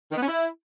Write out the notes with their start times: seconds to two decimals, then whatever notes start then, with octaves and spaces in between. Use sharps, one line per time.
0.12 D#3
0.17 B3
0.23 C#4
0.28 E4